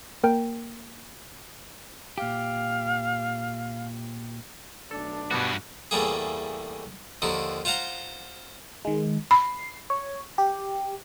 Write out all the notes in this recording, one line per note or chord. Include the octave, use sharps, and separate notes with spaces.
A#3 A#4 G5
A#2 G4 F5
B1 A3 D4 A4
G2 B2 G3 B3 F#4
E2 A2 G3 A#3 G#4
D#2 D3 D#3 F3
F4 C5 F5 F#5 A#5
D#3 G#3
B5 C7
C#5
G4